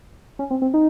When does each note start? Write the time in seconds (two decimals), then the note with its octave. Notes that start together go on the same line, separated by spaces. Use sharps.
0.39 C#4
0.51 C4
0.62 C4
0.74 D#4